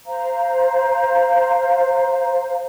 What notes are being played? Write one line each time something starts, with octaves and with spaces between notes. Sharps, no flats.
C5 F5 A#5